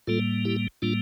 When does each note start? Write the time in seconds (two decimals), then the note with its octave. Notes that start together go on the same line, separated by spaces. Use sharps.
0.07 A2 G3 A#3 F4 A4
0.45 E4 G4
0.82 A2 G3 A#3 D4 F4